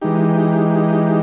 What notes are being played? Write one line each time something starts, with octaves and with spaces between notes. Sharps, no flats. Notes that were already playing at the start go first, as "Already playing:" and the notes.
E3 G#3 D#4 G4